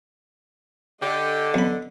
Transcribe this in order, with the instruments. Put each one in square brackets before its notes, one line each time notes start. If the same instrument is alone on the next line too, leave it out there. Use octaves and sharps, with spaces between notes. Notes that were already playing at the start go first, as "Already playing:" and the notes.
[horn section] D3 [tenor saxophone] G4 [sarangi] D#5
[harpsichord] B1 B5